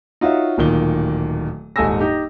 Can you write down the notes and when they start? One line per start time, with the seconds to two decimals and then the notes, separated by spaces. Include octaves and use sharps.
0.21 D#4 F4 F#4 C#5 E5
0.58 D1 A#2 D#3 G7
1.76 D#1 G#2 A4 G#5 E6 A#6
2.00 D#4 G4